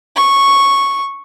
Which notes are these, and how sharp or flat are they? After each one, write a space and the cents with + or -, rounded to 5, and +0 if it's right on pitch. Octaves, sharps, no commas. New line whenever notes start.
C#6 -5